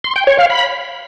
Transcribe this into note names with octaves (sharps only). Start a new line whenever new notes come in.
C6
G5
C#5
F5
B5